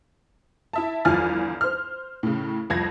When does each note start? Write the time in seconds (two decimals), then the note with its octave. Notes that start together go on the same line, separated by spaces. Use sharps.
0.73 E4 E5 A5
1.05 G1 E2 F3 G#5 F6 A6
1.61 C5 F6
2.23 A2 C#3
2.70 C2 F2 G#6 A#6